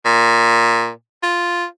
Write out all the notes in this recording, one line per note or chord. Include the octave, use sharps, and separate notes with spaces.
A#2
F4